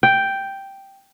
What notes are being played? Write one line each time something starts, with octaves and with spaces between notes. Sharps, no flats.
G5